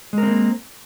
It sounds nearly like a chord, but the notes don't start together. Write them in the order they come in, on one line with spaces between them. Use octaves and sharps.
G#3 A#4 C4 A#3